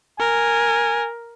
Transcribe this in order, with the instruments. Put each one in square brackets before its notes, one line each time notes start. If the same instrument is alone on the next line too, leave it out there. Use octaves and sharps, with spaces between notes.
[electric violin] A#4 [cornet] G#5